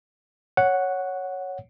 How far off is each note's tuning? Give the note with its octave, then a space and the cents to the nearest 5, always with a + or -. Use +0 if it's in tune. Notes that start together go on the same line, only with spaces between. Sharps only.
C#5 +0 F#5 +0